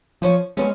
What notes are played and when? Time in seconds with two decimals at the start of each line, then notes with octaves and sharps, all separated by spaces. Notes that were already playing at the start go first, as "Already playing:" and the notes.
0.22 F3 C#4
0.57 G#3 B3 C#4